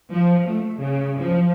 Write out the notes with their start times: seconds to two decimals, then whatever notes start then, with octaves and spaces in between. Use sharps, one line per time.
0.12 F3
0.46 A3
0.78 C#3
1.19 F3